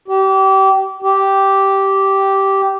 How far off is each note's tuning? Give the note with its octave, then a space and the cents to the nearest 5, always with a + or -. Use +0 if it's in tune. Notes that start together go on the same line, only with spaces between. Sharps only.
G4 -30
G4 -10